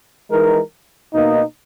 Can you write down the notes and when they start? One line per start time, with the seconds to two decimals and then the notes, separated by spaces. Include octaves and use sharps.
0.30 E3 G#3 D#4 A#4
1.13 B2 A#3 D#4